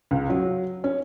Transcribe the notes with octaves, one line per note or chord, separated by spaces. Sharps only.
C#2
F#3
C#4